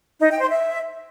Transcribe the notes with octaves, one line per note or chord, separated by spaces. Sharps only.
D#4
G5
C5
E5